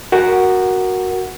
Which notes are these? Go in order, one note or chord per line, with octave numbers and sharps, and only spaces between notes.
F#4 A#4 F#5